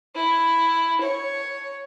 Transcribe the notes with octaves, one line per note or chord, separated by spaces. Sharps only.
E4
C#5